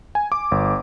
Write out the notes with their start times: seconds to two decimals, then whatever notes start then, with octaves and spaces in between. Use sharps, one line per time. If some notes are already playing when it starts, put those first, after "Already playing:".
0.15 G#5
0.32 D6
0.51 G1